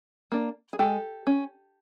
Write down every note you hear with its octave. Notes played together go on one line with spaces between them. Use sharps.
A#3 D4
G#4
G#3 G4 A4
C#4